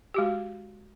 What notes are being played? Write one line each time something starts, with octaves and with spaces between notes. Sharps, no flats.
G#3 F#4 G4